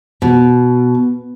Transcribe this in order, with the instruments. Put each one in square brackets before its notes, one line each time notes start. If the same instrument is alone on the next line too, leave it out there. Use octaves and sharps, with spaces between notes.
[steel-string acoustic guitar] B2